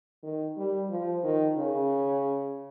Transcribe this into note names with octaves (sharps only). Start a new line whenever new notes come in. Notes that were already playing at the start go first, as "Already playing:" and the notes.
D#3
G3
F3
D#3
C#3